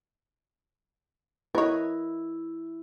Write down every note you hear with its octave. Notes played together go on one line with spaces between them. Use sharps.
E4 A#4 B4 C#5 D#5